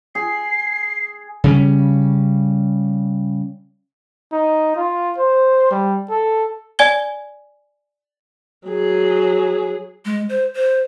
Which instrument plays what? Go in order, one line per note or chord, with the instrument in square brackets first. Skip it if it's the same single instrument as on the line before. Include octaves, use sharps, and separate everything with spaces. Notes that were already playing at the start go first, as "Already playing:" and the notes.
[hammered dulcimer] G#4 [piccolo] C7
[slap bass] C#3 G3 C#4
[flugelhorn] D#4
F4
C5
G3
A4
[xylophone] D5 G#5 G#6 G7
[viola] F#3 G#4
[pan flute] G#3
C5
C5